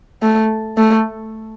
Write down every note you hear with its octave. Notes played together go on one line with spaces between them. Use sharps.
A3
A3